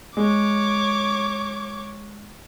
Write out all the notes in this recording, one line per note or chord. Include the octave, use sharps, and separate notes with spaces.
G#3 C#5 D6